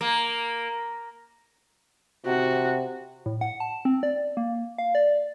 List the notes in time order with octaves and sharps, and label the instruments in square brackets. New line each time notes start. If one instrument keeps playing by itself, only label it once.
[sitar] A#3
[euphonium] C3 [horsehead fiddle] F#4
[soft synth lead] A2
F#5
A5
C4
D5
A#3
F5
D5